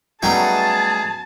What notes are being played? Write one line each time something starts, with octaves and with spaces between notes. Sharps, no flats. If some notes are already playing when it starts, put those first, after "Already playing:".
F#3 G3 A3 B3 C#4 D#4 G#4 A5